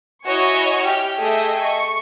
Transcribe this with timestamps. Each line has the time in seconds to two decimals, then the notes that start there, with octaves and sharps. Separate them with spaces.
0.24 E4 F#4 C#5 D#5 G#5 C#6
0.84 G4 F6
1.16 A3 G#4 A4 D#5 E5 G5
1.62 C#6